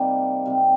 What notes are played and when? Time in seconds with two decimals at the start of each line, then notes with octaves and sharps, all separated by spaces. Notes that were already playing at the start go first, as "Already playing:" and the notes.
Already playing: C3 G3 A#3 D#4
0.46 C3 G3 C4